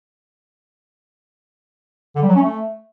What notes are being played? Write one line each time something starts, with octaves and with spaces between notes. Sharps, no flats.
D3
G3
F#3
C#4
A3